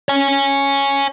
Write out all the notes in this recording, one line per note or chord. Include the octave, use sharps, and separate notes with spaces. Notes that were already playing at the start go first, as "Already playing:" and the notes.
C#5 G#5